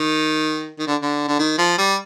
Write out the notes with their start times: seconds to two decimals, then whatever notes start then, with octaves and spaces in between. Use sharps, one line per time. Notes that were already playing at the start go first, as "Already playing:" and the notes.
Already playing: D#3
0.79 D#3
0.87 D3
1.02 D3
1.28 D3
1.39 D#3
1.58 F3
1.78 G3